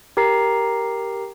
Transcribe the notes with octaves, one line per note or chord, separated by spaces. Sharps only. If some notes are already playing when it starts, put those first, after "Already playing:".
G4 A#4 A#5 C7